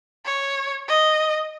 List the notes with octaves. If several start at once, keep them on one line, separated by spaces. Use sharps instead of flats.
C#5
D#5